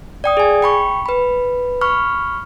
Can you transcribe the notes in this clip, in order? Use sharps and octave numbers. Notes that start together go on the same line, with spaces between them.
D5 G5 D#6
G#4 G#5
G5 B5 C#6
B4 B5
B5 C#6 F6